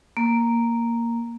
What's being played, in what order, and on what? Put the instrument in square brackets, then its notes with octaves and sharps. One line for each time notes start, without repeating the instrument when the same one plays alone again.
[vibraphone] A#3